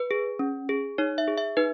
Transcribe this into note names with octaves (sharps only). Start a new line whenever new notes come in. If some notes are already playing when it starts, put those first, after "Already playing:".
Already playing: B4
G#4
C#4
G#4
D#4 C#5
E5
G#4
E5
D#4 B4